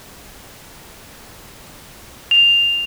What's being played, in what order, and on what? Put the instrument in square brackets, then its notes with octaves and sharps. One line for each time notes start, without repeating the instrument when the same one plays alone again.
[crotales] F7